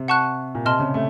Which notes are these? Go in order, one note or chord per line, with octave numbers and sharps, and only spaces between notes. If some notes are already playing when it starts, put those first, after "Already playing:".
Already playing: C3
F#5 A5 C#6 F#6
A#2
C3 D#5 A5 C6 F6
C#3
A3